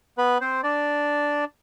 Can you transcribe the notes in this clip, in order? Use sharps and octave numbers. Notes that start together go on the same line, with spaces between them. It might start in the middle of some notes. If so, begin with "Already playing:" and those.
B3 B4
C4 C5
D4 D5